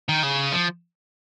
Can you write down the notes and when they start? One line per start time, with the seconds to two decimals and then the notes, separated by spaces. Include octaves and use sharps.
0.09 D#3
0.23 C#3
0.52 F3